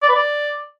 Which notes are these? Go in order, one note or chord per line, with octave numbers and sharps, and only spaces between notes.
D5
B4
D5